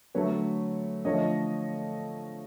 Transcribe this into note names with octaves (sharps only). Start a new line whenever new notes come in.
D3 F#3 A3 B4 C#5
D3 F3 A3 C#5 D#5